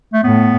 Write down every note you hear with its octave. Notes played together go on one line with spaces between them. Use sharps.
A3
A2 B3